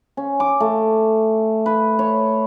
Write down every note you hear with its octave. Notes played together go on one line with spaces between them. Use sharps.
C#4
D6
A3
B4
C#5